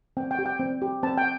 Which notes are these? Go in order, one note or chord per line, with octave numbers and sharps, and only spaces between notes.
C4 G5
G5
G4
G5
C4
G4
C4 A5
G5